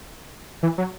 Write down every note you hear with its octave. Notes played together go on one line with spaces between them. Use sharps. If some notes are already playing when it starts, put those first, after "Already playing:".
E3
F#3